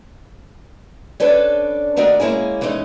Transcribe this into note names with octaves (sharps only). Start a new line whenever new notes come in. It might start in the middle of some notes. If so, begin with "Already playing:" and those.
C#4 D4 A4 B4 D5
D#3 A3 D4 F#4 A#4 D#5
G#3 A#3 C#4 E4 G#4
E3 G#3 A3 C#4 D#4